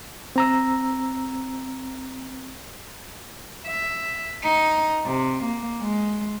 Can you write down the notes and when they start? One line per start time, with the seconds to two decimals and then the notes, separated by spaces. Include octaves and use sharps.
0.36 C4 A#5 E6
3.67 E5
4.44 D#4
5.06 C3
5.43 A#3
5.82 G#3